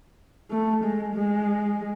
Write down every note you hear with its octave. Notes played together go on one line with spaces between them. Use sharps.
A3
G#3
G#3